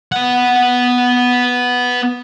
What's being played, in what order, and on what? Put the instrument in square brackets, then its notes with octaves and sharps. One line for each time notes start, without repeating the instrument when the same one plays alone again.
[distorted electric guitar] B3 F#5